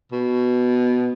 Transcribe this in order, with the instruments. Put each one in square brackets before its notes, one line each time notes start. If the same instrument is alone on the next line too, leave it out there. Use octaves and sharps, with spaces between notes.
[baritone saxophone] B2